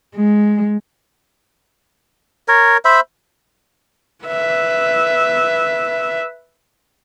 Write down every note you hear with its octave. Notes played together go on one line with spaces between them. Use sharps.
G#3
A#4 C#5
C5 E5 B5
B4 E5